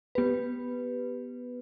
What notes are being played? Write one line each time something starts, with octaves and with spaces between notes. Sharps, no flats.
B3 G4 B4